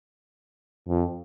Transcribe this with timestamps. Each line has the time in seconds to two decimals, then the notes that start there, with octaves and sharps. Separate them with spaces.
0.88 F2